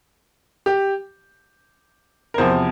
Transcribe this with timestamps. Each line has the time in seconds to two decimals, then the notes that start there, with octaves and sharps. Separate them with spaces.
0.66 G4
2.34 A#4
2.38 E2 C3 F3 C5